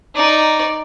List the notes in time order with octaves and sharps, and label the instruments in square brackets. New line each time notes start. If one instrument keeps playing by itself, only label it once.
[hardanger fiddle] D#4 D5